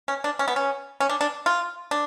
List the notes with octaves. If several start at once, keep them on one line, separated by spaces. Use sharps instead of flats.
C#4
D4
C#4
B3
C#4
C#4
D4
D4
F4
D4